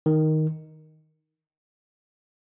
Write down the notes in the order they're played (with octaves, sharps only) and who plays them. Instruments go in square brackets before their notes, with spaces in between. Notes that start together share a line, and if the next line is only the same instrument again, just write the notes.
[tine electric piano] D#3